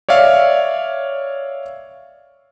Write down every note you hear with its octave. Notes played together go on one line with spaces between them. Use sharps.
C#5 D5 E5 F5